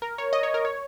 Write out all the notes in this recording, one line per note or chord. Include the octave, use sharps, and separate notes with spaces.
A#4
C#5
D#5
C#5
A#4
C#5